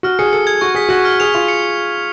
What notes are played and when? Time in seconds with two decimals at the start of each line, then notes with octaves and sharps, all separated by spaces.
0.03 F#4 F6
0.19 G#4 C#7
0.33 A4 C#7
0.47 G#6
0.61 F#4 C#6
0.75 G#4 B6
0.89 F#4 C#6
1.05 F6
1.20 G#4 F7
1.34 F4 F7
1.48 C#7